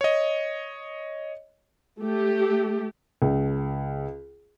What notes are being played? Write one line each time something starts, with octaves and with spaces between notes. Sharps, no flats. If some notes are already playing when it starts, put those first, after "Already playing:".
C#5 D#5
A3 G4
C#2